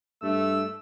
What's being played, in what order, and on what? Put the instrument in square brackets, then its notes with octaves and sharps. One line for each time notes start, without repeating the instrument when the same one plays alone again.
[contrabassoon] G2 [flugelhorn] A3 [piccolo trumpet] E6